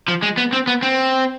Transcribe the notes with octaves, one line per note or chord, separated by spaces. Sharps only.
F3
G#3
B3
C4
B3
C4